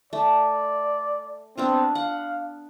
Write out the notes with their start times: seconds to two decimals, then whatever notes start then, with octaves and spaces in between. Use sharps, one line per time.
0.13 A3 D5
1.58 B3 C4 D4 F4
1.95 F5 F#5